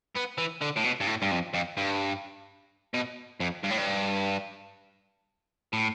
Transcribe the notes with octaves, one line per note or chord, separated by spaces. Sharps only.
B3
E3
D3
A2
B2
G2
A2
G2
F2
F2
G2
B2
F2
G2
A2
G2
A2